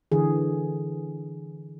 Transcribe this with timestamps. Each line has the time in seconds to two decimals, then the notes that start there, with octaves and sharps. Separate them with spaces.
0.12 D3 E3 G#4